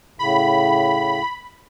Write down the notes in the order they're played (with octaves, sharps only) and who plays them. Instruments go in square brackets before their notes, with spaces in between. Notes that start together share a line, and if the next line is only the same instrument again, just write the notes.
[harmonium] A2 C#3 [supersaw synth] B5